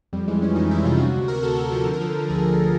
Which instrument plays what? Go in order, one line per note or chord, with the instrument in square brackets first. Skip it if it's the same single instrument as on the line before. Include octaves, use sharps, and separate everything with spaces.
[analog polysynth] F2 G3
E3 G#3
F2 C#4
F2 D#4
F2 E4
C3 F4
C3 F#4
D2
D2 A#4
D2 A4
D2 A#4
F3 A#4
D3 A4
A#4
F3 A4
D3
D2 G#4
D2